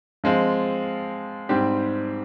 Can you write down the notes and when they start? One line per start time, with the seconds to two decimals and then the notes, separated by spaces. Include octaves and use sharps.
0.24 F3 G#3 C4 F4
1.49 G#2 G3 C4 G4